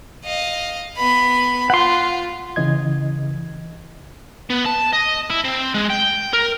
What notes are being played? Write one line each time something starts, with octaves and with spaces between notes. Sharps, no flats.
D#5 F5
B3 B5
F4 F#5 C6
C#3 E3 D#5 G#6
B3
A5
D#5
E4
C4
G#3
G5
A#4